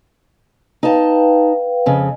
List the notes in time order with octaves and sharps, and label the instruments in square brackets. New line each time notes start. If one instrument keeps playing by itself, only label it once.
[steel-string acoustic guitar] D#4 A5 [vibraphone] B4 F5 G5
[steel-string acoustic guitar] F2 C#3